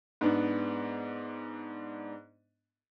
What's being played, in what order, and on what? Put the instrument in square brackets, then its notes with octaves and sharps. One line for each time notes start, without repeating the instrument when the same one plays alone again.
[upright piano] G#2 B3 D4